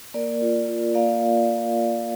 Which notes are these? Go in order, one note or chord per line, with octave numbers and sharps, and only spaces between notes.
A#3 A#4 D5
F4
F4
A#3 D5 F5